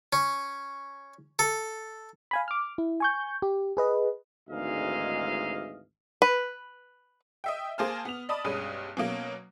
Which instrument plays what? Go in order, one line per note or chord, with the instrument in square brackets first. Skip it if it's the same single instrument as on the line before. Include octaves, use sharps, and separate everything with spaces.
[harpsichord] C#4
A4
[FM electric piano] F5 G#5 B5
D6 F6
E4
G#5 C#6 G6
G4
G#4 B4 D#5
[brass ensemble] G#1 D2 G#2 E3 D#5 F5
[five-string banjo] B4
[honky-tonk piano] D#5 E5 G5
A#3 G#4 C5 G#5 A5 F6
B3 F7
D5 D#5 A5 B5 D#6
B1 G2 G#3 C#4 D#6 D#7
B2 F#3 A#3 C#4